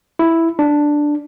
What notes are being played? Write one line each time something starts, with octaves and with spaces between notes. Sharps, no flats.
E4
D4